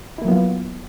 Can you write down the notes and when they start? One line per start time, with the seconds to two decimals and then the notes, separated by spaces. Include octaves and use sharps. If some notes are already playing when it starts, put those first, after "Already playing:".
0.18 E4
0.22 A#3
0.25 F#3
0.28 B3
0.32 F4